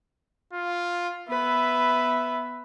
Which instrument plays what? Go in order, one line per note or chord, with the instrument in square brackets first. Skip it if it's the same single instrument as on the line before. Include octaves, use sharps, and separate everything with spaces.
[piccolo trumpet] F4
[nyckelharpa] B3 B4 [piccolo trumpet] E5